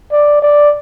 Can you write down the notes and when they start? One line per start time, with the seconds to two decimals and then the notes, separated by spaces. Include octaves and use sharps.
0.12 D5
0.42 D5